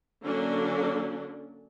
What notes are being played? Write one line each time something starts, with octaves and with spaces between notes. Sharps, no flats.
D3 F#3 A#3 C#4 D4